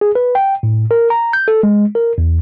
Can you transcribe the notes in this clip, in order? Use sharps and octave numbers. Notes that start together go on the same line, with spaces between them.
G#4
B4
G5
A2
A#4
A#5
G6
A4
G#3
A#4
E2